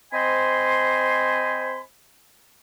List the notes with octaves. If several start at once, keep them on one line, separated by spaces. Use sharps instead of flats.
C4 C5 D#5 G#5 B5 C6